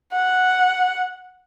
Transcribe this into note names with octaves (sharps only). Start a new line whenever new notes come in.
F#5